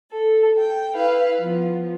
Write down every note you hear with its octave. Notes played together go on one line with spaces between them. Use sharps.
A4
G5
E4 B4 F5
F3 B3